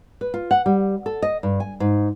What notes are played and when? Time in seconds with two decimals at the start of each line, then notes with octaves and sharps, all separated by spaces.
0.21 B4
0.34 F4
0.51 F#5
0.66 G3
1.06 A4
1.22 D#5
1.43 G2
1.60 G#5
1.80 G#2